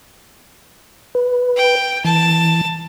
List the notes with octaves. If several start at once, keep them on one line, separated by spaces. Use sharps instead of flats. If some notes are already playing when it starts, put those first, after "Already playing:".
B4
G5
E3 A5